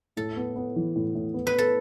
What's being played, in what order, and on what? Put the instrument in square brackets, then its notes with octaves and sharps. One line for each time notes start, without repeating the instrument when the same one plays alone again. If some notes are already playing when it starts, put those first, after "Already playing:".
[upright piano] A2 [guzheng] A4
[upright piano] B3
B3
E3
A2
A2
B3
[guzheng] B4
[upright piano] B3 [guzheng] A4